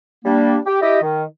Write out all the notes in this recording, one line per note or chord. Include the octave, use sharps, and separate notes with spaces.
G3 A#3 D4
G4
E4 G4 D#5
D#3